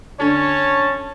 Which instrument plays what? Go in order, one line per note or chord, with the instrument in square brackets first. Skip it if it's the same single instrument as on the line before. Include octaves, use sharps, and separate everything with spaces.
[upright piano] D3 [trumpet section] C#4 C#5 A5